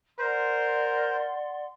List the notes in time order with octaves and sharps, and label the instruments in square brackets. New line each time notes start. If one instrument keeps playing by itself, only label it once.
[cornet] A#4 [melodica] C5 [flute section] D5 F#5 C6